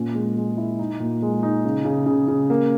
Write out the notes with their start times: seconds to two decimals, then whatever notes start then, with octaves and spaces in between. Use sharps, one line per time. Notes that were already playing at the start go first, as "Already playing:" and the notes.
Already playing: A#2 C#4
0.15 G#3
0.37 G#3
0.57 E4
0.79 D#4
1.00 A#2
1.22 G#3
1.43 D#4
1.65 C#3
1.85 C#3
2.06 C#3
2.28 C#3
2.50 A#3